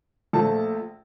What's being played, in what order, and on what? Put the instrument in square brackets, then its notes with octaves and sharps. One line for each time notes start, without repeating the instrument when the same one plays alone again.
[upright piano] A#1 A#2 A3 A5